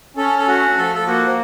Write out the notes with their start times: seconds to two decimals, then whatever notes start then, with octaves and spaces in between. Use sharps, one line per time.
0.17 C#4 A4
0.38 A4
0.48 A3 F#4
0.77 F3 A4
0.95 A4
1.07 A#3 F#4